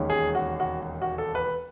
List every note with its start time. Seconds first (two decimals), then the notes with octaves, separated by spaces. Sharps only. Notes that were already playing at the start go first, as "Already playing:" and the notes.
Already playing: E1 D#2 D#3 G#3 C#4
0.10 G#4
0.35 F#4
0.60 F#4
1.02 F#4
1.18 A4
1.35 B4